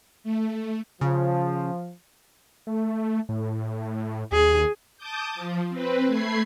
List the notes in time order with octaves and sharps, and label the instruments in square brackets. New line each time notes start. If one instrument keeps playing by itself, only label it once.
[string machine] A3
[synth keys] C#3 [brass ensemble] F3
[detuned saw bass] A3
A2
[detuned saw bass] D#2 [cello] G#4
[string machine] A5 D6 D#6 G6
F3
C4 B4
A3 B5 G#6 C7